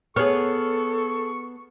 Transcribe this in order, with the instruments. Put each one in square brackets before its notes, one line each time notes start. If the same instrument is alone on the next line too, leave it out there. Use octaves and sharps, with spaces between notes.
[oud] B3 C#5 [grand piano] G#4 F6 [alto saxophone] A4 [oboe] C#6